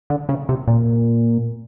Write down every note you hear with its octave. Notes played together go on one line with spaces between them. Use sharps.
D3
C#3
C3
A#2